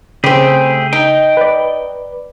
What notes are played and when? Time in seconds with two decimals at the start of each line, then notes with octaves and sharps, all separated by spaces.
0.24 C#3 G3 A3 C4 G4 G#4
0.93 D#4 G5
1.37 B4 D5